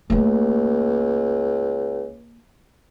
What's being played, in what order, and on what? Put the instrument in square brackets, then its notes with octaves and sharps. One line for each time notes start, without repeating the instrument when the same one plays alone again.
[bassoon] C#2 [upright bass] A3 A#3